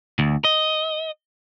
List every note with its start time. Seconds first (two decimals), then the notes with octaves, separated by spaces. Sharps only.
0.19 D2
0.45 D#5